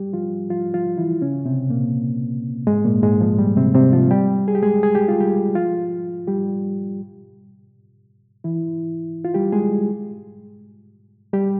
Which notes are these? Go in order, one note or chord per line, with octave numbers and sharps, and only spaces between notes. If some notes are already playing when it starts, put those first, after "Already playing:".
Already playing: G3 G4
F3 F4
F3 F4
F3 F4
E3 E4
C#3 C#4
C3 C4
A#2 A#3
G#2 G#3
A#2 A#3
G#2 G#3
F3
G3
C3 C4
C3 C4
F3 F4
G3 G4
G#4
G4
G#3 G#4
G#4
G4
F4
G3 G4
F3 F4
G3 G4
E3 E4
F4
G3 G4
G#3 G#4
G3 G4